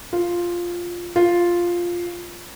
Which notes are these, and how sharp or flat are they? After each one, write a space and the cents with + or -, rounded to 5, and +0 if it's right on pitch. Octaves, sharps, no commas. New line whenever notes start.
F4 +0
F4 +0